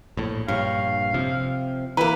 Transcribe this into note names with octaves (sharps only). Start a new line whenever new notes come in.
A#1 A2
A#1 G2 C#5 F5
C3 F3
E3 A#3 B4